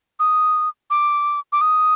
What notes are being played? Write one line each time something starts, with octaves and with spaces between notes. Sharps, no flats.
D#6
D6
D6
D#6